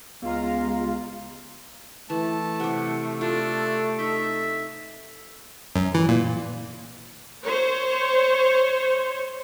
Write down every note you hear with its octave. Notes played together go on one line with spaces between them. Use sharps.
C#2 G#3 B3 F4 F5 A#5
E3 A3 A5
C3 G4 F#5
D4 F4 A4
D#4 A4 D#5 E5
F#2
E3
A#2
C5 C#5